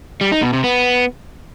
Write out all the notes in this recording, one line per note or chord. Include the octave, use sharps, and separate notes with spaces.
G3
D#4
B2
C3
B3